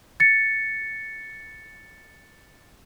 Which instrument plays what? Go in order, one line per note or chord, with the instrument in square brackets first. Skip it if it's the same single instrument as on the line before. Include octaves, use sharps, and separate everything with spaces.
[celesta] A6 C#7